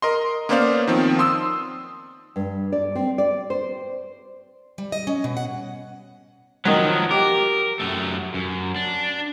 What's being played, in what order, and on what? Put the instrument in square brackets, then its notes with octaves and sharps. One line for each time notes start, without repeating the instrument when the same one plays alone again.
[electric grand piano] A#4 D#5 C6
A#3 B3 C#4 C5 D5 F5
D#3 F3 C4
C6 D#6 E6
[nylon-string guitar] G2
D5
C4
D5
C5
[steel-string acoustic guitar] G3
D#5
C#4
B2
F#5
[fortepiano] D#3 F#3 [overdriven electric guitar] F3 B3
[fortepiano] G4 D6 [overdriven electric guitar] A#4
[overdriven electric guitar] F#2 A3
F#2
D4